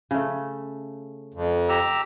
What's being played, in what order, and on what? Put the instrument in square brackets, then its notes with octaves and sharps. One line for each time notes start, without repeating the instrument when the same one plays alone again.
[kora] C#3 A3
[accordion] F2
[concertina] G4 A#5 E6